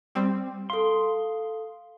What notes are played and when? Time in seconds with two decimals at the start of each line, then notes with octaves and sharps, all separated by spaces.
0.15 G3 C4
0.70 A4 F5 C6